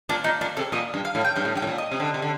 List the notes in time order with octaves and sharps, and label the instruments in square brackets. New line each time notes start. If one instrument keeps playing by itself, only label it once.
[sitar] A#2 [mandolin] D4
[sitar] A#2 [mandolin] D#4
[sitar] A#2 [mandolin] D4
[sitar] C3 [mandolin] A4
[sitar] A#2 [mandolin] D#5
[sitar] G2
[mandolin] F5
[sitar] A2
[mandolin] G5
[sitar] G2 [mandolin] F5
[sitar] A2
[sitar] G2 [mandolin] G5
[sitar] A2
A#2
[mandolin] D#5
[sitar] C3
D3
C3
D3